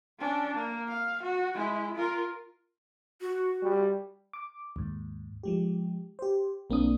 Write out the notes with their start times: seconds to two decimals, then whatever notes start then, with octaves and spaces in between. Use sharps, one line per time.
0.19 C#4 D4
0.54 A#3
0.88 F5
1.23 F#4
1.54 G#3 E4
1.96 F4 A#4
3.21 F#4
3.63 G3
4.33 D6
4.76 D#2 G#2
5.43 F3 G#3 G4
6.19 G4 C5
6.70 B1 A#3 C4 D4 D#6